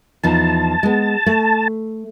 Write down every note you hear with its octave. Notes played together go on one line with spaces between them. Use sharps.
E2 F3 D#4 A5
G#3 B3
A3